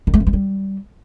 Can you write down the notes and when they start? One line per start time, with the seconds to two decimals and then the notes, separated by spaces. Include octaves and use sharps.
0.07 D#3
0.14 A3
0.20 E3
0.27 G#3
0.33 G3